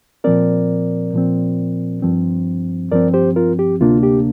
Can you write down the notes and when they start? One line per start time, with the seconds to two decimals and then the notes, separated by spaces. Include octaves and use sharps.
0.24 A#2 F3 C4 A#4 D5
1.13 A#2 F3 C4
2.02 G2 F3 C4
2.91 G2 F3 C4 A#4 D5
3.14 G4 C5
3.36 F4 A#4
3.59 G4
3.80 D2 C3 A#3 D4 F4
4.03 G4